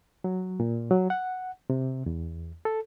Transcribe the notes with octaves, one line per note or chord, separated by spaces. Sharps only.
F#3
A#2
F#3
F#5
C3
E2
A4